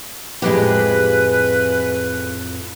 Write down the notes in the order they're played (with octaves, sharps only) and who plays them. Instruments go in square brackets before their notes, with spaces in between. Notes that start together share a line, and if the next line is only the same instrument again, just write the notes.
[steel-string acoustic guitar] F2 A2 [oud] G#3 C4 G4 [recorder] B4